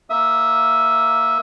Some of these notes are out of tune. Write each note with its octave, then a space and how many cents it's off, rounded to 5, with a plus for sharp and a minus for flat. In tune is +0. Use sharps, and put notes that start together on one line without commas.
A#3 +0 E5 -5 D#6 +30